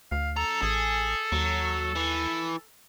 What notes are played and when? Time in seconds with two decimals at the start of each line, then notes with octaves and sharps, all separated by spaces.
0.12 D2 F5
0.37 F#2 A4 A#5
0.62 A1 G#4
1.32 D#2 F#3
1.96 E3